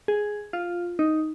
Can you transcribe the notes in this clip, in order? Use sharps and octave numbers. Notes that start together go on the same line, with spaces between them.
G#4
F4
D#4